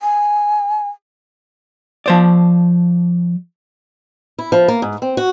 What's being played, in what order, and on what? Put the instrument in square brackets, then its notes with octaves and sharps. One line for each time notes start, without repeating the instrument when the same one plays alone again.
[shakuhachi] G#5
[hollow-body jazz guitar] F3 C5 D5
[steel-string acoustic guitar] E4
F3
A#3
G#2
C4
F#4